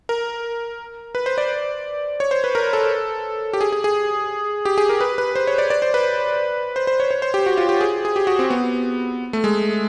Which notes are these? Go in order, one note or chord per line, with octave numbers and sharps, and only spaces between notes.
A#4
B4
C5
D5
C#5
C5
B4
A#4
A4
G4
G#4
G#4
G#4
G4
G#4
A#4
B4
B4
C5
C#5
D5
D5
C5
B4
C5
C5
C#5
C#5
C5
G4
F#4
F4
G4
G#4
G#4
G4
F#4
C4
B3
A3
G#3